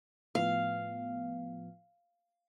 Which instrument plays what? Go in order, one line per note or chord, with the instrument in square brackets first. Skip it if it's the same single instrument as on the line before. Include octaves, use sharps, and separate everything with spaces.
[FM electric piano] A2 F3 B3 [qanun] F5